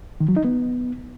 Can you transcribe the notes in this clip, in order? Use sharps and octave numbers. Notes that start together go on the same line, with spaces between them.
D#3
F#3
D#4
B3